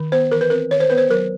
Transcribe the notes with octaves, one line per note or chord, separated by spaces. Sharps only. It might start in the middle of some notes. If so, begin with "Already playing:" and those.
Already playing: D#3
B3 C5
E3 A#4
B4
C4 A#4
D#3 C#5
C5
B3 B4
C5
F#3 A#4